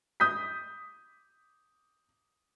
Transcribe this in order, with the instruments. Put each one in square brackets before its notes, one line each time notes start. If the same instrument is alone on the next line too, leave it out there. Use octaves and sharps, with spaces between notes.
[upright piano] D#6 G6 B6